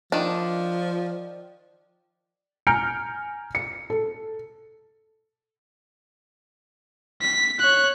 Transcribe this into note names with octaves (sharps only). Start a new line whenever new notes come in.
D#3 F3 D4
G#5 A#5 F6 G6 C#7 D7
C#7
A4
B6
C#5 F#6